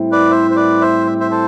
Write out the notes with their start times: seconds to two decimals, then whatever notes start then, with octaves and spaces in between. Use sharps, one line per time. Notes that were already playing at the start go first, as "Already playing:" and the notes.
Already playing: A2 G3 C4 E4
0.12 B4 D5
0.31 C5 E5
0.51 C5
0.56 B4 D5
0.81 C5 E5
1.07 E5
1.20 C5 E5
1.31 A4 C5